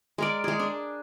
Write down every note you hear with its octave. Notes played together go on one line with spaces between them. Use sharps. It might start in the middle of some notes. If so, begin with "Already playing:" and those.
G#3 A#4 D5
G#3 G#4
D4